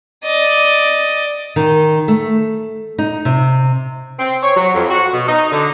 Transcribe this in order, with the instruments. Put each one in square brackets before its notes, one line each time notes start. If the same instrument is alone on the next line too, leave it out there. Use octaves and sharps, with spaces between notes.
[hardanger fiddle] D5 D#5
[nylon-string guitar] D#3
A3
D#4
C3
[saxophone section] C4
C#5
F#3
F2
F#4
B2
D#4
D3